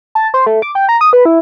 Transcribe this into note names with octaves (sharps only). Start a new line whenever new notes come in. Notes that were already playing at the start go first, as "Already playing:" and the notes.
A5
C5
A3
D6
G5
A#5
D#6
B4
E4